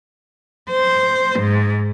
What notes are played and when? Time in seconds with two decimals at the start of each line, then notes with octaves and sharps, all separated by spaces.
0.71 C5
1.39 G#2